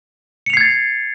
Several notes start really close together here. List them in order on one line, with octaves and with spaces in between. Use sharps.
C#7 F7 C7 G#6 A6